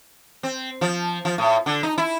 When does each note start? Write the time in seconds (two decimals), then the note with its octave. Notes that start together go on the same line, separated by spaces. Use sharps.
0.43 C4
0.81 F3
1.25 F3
1.38 A2
1.66 D3
1.83 D#4
1.98 E4